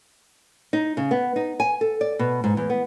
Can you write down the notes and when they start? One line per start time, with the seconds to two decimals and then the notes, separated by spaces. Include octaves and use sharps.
0.73 D#4
0.97 C#3
1.11 B3
1.36 D#4
1.60 G#5
1.81 A4
2.01 D5
2.19 B2
2.44 G#2
2.57 E2
2.70 B3